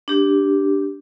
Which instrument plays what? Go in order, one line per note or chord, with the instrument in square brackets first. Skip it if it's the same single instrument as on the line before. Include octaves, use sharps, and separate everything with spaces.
[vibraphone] D4 G4